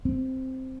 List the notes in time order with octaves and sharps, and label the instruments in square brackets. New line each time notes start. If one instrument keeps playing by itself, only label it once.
[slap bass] C4